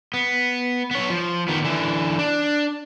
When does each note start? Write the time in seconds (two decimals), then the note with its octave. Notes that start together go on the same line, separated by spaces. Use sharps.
0.14 B3
0.91 B3 C#5
1.10 F3
1.48 D#3 B3
1.64 D3 E3
2.19 D4